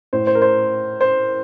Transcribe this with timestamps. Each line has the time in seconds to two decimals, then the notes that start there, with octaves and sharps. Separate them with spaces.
0.13 A2 C5
0.27 C5
0.35 A#4
0.42 C5
1.01 C5